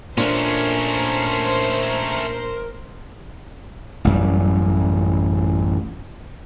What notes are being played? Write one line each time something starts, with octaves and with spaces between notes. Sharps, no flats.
A#2 A3 C#4 D4 A#4 C5
A1 F#2 G3